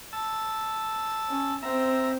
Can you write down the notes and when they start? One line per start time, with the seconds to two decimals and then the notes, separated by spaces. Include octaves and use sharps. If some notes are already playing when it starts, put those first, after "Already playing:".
0.13 A5 E6
1.29 C#4
1.62 C4 E5 A#5